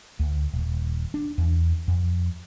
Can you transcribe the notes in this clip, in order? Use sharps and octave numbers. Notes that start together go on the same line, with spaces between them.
D2
D#1
D4
E2
F2